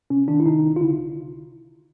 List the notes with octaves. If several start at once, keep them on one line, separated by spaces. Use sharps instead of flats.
C3 C#4
D#3 D4
E4
C3 D#4
C2
F4
D3 E4